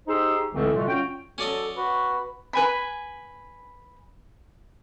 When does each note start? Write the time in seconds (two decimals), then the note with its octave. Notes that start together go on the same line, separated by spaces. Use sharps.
0.08 D#4 G4 G#4 C5 C6 E6
0.53 C#2 A2 D3 E3 A3 C4
0.75 B2 D3 G3 A3 F4 F#4
0.88 C#4 F4 F#4 G5
1.38 F#3 C#4 A4 D5 D#5
1.77 F#4 B4 B5
2.53 B4 G#5 B5